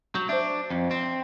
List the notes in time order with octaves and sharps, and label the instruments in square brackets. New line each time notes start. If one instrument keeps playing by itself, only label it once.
[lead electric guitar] F#3 [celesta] G6
[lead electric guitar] D4 [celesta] C5 E5
[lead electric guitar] F2
C4